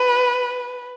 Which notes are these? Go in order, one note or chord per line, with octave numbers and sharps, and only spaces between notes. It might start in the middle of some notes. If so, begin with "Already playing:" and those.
Already playing: B4